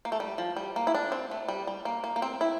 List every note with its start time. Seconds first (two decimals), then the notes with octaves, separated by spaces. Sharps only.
0.05 A#3
0.12 A3
0.20 G3
0.38 F3
0.57 G3
0.76 A#3
0.87 E4
0.95 D4
1.12 C4
1.31 A3
1.48 G3
1.67 G3
1.85 A#3
2.04 A#3
2.16 A#3
2.22 C4
2.41 E4